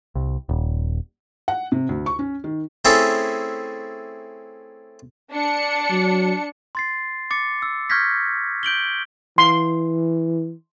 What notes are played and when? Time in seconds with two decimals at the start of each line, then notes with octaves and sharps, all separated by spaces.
0.15 C2
0.49 D#1
1.48 F#5
1.72 C3
1.89 D2
2.06 C#6
2.19 C#4
2.44 D#3
2.85 A3 C4 C#4 E4 G#4 A4
5.32 D4 C#7
5.90 F#3
6.75 C6 A6 C7
7.31 D6 A6 C#7
7.62 E6
7.90 C#6 F6 G6 G#6 A#6 B6
8.63 G6 D7 F#7 G7
9.38 E3 C6